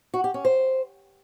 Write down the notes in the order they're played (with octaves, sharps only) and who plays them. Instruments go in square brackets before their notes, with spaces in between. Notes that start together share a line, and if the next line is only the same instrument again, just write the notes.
[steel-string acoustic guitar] F#4
G4
C#4
C5